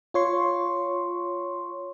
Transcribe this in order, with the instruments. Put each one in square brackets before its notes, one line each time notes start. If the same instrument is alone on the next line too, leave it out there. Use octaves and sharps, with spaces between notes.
[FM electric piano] F4 C#5 C6 C#6